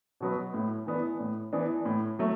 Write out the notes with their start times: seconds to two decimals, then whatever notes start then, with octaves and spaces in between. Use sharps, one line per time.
0.20 B2 F#3 B3
0.54 A2
0.87 E3 B3 D4
1.20 A2
1.53 E3 B3 D4
1.86 A2
2.19 F#3 A3